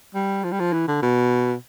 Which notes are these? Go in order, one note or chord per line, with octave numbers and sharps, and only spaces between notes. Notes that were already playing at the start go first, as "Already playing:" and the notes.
G3
F3
G3
F3
E3
D3
B2